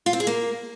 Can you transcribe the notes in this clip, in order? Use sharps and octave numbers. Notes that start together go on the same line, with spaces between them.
F4
C4
G#4
A#3